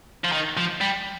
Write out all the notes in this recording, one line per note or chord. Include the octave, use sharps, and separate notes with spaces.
F3
D#3
F3
G3